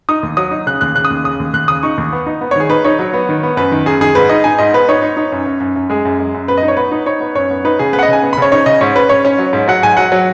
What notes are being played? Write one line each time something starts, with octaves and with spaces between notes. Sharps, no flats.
D#4 D#6
D#2
F#3 D#6
D#4
C#3 F#6
D#2 F#6
C#3 F#6
D#6
D#2
C#3 D#6
D#2
D#2 F#6
C#3 D#6
D#4 C#6
D#2
B3
D#4
B3
C#5
D#3 G#4
D#4 B4
D#4 C#5
F#3
B3
D#3
B3
F#2 B4
D#3
F#2 G#4
D#3 G#4
G#2 B4
D#4 D#5
D#4 G#5
G#2 D#5
B3 B4
D#4 C#5
D#4
D#4
F#2
F#2
F#2
F#2
G#3 G#4
F#2
G#3
F#2
B3 B4
D#5
D#4
C#5
B3 B4
D#4
D#4 C#5
B3
F#2 C#5
B3
D#4 B4
C#3 G#4
B3 B4
F#5
D#5
C#3 G#5
B3
B5
C#3 C#5
D#4 C#5
C#3 D#5
G#2 C#5
C#4 B4
C#4 C#5
C#4
F#3
G#2
F#3 F#5
G#2 G#5
F#3 F#5
F#3